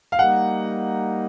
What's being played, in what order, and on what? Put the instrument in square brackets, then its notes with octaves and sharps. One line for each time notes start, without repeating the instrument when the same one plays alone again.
[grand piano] F5
[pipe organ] G3 A#3 D#4 [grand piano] F#5